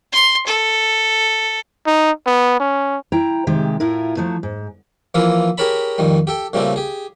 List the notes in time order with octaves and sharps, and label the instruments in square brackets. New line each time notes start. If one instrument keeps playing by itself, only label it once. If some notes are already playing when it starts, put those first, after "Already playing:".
[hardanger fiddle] C6
A4
[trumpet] D#4
B3
C#4
[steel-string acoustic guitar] E4 G5 A#5
C3 D#3 G#3 G4
A2 E4 F4 A#4
F3 F#3 A3
G#2
[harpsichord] E3 F3 A#3 E4 F4
G4 G#4 A#4 C#5 A5 B5
F2 D#3 G3
G4 A4 G5
A#2 C#3 G3 A3 A#3 C4
G4 G#4